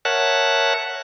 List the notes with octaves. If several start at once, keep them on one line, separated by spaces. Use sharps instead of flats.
A#4 C#5 E5 F#5 A5 F#6